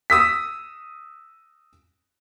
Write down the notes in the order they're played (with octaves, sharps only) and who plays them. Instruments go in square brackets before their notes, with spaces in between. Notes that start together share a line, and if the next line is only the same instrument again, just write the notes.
[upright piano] D#6 E6 B6